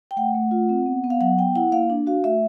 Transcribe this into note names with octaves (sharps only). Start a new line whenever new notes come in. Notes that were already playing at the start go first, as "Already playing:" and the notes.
G5
A3 F#5
A3
F4
C4
B3
B3
F5
F#3 F#5
B3 G5
E4 F#5
A#3 F5
D4
F#4 F5
A3 E5